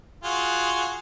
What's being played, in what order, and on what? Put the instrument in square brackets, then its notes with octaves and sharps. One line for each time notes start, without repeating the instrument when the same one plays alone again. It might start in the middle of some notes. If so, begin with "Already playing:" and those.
[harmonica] F4 F#4 G#4